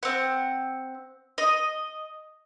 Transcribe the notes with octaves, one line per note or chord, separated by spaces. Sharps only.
C4 F#5
D#5